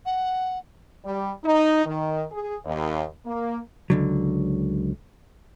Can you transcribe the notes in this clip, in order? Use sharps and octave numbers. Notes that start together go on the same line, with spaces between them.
F#5
G3
D#4
D#3
G#4
D#2
A#3
C#2 D3 F#3